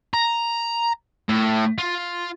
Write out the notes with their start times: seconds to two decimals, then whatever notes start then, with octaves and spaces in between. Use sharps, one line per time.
0.14 A#5
1.29 A2
1.78 F4